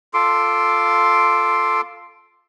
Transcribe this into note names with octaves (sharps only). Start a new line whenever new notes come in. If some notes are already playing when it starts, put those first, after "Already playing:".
F4 A4 C6 D6